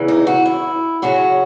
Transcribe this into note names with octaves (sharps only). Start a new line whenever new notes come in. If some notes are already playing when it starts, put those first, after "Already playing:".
Already playing: E2 C#3 E3
D#4
F#4
E4
F#2 C#3 F#3 F#4